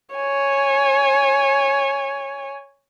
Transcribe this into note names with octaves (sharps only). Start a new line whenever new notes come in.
C#5 G#5